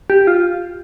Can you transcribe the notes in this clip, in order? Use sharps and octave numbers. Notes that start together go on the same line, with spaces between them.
G4
F4